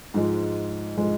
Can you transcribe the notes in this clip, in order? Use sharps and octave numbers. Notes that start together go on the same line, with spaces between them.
G#2 F3 G#3
F3 G#3